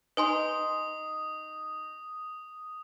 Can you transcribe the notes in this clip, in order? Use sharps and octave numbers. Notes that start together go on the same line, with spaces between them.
D#4 B4 G#5 C6 D#6